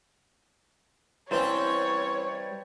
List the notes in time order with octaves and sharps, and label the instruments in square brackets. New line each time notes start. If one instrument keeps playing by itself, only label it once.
[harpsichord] E3 C4 C#4 [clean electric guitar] G3 C5 [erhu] C#5